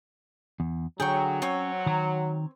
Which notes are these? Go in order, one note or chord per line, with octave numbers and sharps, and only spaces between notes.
E2
D3 F#3 G#4 G5 C#6
C4 C#4 C#5
D#3 A#5